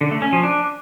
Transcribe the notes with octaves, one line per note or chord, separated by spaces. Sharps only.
D3
A3
C#4
F3
D4